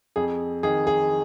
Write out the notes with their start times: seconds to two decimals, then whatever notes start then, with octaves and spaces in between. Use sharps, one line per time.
0.16 F2 G#4
0.63 D#3 G#4
0.87 G#4